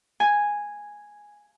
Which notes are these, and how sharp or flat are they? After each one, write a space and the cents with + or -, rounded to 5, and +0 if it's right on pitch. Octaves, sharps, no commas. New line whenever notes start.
G#5 -5